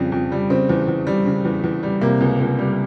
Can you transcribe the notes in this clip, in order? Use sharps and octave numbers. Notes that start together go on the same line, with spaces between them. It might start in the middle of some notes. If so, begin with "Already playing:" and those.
Already playing: F2 C#3 G3
F2
G3
C#3 C4
E2
E2
G3
C#3
E2
E2
G3
C3 A#3
C#2
C#2
G3